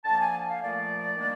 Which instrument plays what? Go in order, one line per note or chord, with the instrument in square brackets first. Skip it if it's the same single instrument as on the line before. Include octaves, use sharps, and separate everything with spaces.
[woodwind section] D3 F3 A#3 A5
G#5
F5
A#2 F3 A3 D5
D#3 G3 A#3 D4